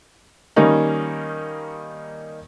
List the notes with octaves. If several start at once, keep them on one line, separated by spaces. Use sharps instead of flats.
D#3 G3 A#3 C#4 D#4